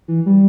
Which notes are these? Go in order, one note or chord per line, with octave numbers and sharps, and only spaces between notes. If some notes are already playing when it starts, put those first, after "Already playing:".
E3
G3